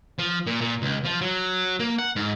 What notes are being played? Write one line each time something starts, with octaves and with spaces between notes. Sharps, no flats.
F3
A#2
A#2
C#2
F3
F#3
A#3
F#5
G#2